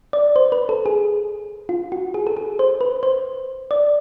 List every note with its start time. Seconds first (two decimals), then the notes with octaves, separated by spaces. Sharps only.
0.13 D5
0.36 C5
0.52 B4
0.69 A4
0.86 G#4
1.69 F4
1.92 F#4
2.14 G#4
2.27 A4
2.37 G#4
2.59 C5
2.81 B4
3.03 C5
3.71 D5